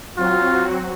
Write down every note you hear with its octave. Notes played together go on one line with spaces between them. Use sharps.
F#3 C4 F4 F#4